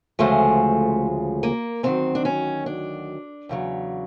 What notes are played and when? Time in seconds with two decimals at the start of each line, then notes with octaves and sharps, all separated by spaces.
0.19 D2 C#3 F3 G#3 A3
1.43 A#3
1.83 D2 C3 D#3 F#3 C4
2.15 D4
2.25 C#4
2.66 D4
3.49 E2 C#3 F#3